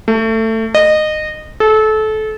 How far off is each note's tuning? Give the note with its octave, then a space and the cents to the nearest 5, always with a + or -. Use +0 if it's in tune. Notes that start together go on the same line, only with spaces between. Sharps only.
A3 +20
D#5 -20
A4 -25